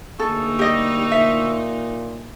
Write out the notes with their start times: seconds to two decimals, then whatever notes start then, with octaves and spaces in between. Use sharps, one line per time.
0.20 D2 A#3 D#4 G#4 A4 C#6 E6
0.59 G3 G4 D#5
1.12 A#2 E5